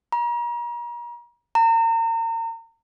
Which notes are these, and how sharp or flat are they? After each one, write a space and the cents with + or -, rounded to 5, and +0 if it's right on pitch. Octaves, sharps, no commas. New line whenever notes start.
A#5 +40
A#5 -35